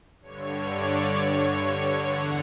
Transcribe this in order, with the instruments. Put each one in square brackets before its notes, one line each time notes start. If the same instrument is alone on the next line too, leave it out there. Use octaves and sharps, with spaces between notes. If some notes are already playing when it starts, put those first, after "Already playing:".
[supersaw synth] G2 D3 C#5
D5
G2 D3 C#5
E2 D3 F#5